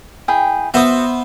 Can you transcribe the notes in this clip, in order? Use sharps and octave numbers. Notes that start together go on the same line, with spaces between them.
E4 G#4 G5
B3 F#4 C5 E5 D#6